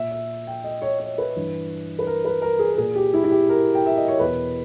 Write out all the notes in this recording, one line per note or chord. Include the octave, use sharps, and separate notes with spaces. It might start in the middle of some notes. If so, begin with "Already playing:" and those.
Already playing: A#2 E5
E5
G5
D#5
C#5
C#5
B4
G2 E3
B4
A#4
B4
A#4
G#4
A#4
A#2 G#4
G4
E4
E4
G4
A#4
G5
E5
D#5
C#5
E2 B2 B4